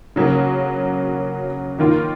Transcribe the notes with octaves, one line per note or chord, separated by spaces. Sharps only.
C#3 F#3 A#3
D#3 A#3 F4